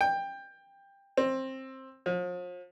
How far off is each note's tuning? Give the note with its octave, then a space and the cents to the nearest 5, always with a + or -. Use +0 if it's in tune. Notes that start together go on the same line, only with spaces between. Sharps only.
G5 +15
C4 +15
F3 +45